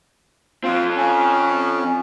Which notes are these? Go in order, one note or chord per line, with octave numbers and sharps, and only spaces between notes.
F3 C4 F4
C#4